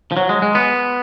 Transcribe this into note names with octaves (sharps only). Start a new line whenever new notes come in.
F3
F#3
G#3
G#3
B3